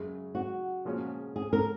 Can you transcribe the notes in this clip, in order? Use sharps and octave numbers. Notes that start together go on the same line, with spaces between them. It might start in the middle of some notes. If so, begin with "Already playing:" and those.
Already playing: F#2 C#3 G#3
F#4
A#2 F3 G#3 C#4
G#4
A#4